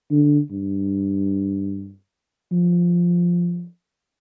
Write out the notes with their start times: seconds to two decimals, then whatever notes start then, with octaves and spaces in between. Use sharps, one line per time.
0.11 D3
0.51 G2
2.52 F3